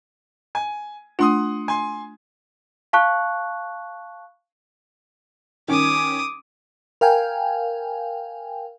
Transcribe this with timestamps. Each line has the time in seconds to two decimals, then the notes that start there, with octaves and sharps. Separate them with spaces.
0.55 G#5
1.19 A3 D4 F4 F#5 C6 D#6
1.68 G#5 C6
2.93 F5 A5 C#6 F#6
5.68 D#3 C#4 D6 D#6
7.01 A#4 F5 G5 G#5